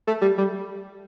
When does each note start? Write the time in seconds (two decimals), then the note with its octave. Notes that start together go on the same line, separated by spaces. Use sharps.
0.07 A3
0.22 G3
0.38 G3